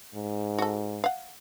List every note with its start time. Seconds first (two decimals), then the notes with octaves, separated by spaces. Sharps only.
0.14 G#2
0.58 F#4 A4
1.04 F5 F#5